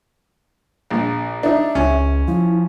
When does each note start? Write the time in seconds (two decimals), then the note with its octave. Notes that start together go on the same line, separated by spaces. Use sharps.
0.91 A#1
1.43 D4 D#4 E5
1.75 C#2 C#4
2.28 F3 E4